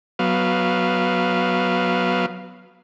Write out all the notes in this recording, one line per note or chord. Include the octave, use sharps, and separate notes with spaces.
F#3 B3 F5